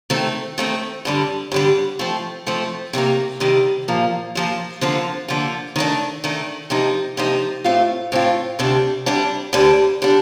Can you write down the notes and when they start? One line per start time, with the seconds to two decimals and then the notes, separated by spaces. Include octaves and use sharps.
0.10 D#3 A3 C4
0.58 D#3 A3 C4
1.05 G2 D3 G3
1.52 G2 D3 G3
1.99 F3 A3 C4
2.46 F3 A3 C4
2.93 C3 D#3 G3 A#3
3.40 C3 D#3 G3 A#3
3.88 A#2 F3 A#3
4.35 A#2 F3 A#3
4.81 D3 F3 A#3 F4
5.28 D3 F3 A#3 F4
5.76 D#3 A3 D4
6.24 D#3 A3 D4
6.70 C3 F3 A#3 D#4
7.17 C3 F3 A#3 D#4
7.64 A2 A3 C4 F4
8.12 A2 A3 C4 F4
8.59 D2 C3 G3 D4
9.06 D2 C3 G3 D4
9.53 D2 D3 G3 D4
10.02 D3 G3 D4